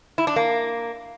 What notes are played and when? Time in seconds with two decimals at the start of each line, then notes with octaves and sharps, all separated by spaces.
0.18 E4
0.27 D4
0.36 A#3